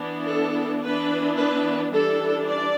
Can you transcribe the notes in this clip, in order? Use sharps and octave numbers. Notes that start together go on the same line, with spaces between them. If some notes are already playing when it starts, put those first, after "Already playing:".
Already playing: E3 B3 D4
A4
E3 B3 D4 B4
B4
E3 G3 D4 A4
D5